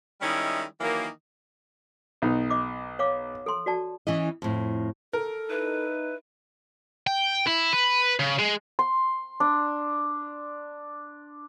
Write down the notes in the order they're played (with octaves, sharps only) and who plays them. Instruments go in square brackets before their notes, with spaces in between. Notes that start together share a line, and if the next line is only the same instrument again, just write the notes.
[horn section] D#3 G3 G#3 C#4 E4
D#3 E3 F#3 A#3
[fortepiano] B1 D#4
[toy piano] D#5 D6
C#5 F5 D6
A4 C6
F#4 D5 A5
[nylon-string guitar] E3 C#4 E4 D#5
F2 A2
[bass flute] A4 [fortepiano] A#4
[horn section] D#4 E4 [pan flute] B4
[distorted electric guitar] G5
E4
B4
C#3
G#3
[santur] C6
D4